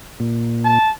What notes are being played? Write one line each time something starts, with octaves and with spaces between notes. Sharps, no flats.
A#2
A5